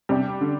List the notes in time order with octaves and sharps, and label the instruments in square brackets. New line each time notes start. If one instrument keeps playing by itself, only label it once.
[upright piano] C3 [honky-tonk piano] G3 D4 G4
[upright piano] D3